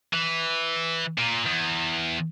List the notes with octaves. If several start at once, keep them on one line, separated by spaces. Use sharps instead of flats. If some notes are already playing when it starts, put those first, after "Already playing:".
E3
A#2
E2